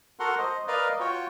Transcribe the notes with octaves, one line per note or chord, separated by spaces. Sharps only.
F#4 A4 A#4 F#5 C6
C5 D#5
A#4 B4 D5 D#5 F5
F4 F#4 C#5 G5